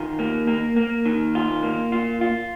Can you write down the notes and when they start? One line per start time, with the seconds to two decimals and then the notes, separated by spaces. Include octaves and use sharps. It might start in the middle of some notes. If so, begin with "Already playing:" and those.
Already playing: D#3 F4
0.19 A#3
0.47 A#3
0.76 A#3
1.06 D#3
1.35 F4
1.63 A#3
1.92 F4
2.21 F4